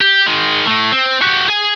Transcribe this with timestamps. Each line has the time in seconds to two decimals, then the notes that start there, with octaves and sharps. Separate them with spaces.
0.01 G4
0.27 D#3 G#3
0.67 A2 A3
0.92 C4
1.22 F#4 G4
1.48 G#4 G#5